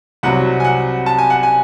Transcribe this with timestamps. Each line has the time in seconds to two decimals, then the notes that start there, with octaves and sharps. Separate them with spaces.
0.23 C2 C3 F#3 F#5
0.60 G#5
0.64 F#5
1.06 A5
1.18 G#5
1.30 F#5
1.43 G#5